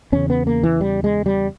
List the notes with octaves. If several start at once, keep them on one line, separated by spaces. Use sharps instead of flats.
E2 C#3 C#4
B3
A#3
E3
G3
G#3
G3